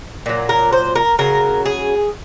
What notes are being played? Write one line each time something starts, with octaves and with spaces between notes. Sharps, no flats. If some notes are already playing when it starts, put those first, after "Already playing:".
A#2 F#3
A#4
C5
A#4
C#3 F#3 A#4
G#4